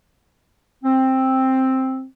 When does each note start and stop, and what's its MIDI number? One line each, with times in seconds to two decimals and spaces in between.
0.83 2.04 60